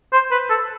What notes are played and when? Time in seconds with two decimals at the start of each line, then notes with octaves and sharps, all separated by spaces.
0.13 C5
0.31 B4
0.50 A4